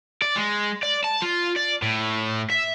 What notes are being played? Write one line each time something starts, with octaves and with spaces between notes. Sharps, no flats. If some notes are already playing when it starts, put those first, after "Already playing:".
D5
G#3
D5
A5
F4
D5
A2
E5